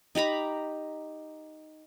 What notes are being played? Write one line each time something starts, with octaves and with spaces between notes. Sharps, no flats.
D#4 G4 A#5 B5